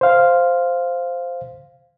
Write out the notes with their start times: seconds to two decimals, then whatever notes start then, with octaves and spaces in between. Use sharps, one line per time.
0.01 C5 F5